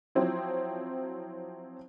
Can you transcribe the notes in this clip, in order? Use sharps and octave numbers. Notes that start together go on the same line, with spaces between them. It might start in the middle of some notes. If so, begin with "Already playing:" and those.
F3 F#3 C4 E4